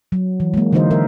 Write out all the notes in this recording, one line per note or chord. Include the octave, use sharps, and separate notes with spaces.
F#3
E3
G#3 A#3
D3 E3 D#4 F#4 C5 D#5
E3 A#4 E5